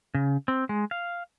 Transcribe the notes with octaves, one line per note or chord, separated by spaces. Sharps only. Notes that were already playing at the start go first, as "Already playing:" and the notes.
C#3
C4
G#3
F5